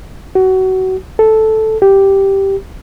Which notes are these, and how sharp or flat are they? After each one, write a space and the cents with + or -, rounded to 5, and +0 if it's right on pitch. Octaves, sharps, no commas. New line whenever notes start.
F#4 +25
A4 -5
G4 -5